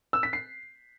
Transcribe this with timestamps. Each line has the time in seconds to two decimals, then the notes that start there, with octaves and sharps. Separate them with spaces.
0.13 E6
0.23 B6
0.33 C7